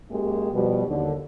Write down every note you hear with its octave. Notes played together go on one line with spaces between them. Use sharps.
F#2 G#3 A#3 G4
B2 F3 G3
D#2 D3